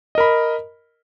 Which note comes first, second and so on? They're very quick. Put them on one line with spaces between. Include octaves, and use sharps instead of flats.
D#5 A#4 B5